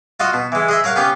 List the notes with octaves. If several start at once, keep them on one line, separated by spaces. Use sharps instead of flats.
F4 F#4 D#5
B2
E3 G#3
G#4 D#5 E5
A#4 C#5 F5 F#5
B3 C#4 G4 F5